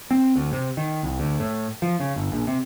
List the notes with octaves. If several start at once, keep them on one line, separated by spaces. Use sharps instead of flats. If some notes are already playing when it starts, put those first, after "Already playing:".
C4
D2
C3
D#3
C2
D2
A2
F3
C#3
G1
A#1
C3